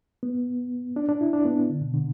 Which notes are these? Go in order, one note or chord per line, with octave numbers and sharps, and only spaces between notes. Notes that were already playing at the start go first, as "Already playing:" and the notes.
B3
D4
D4
E4
D4
B3
D3
B2
D3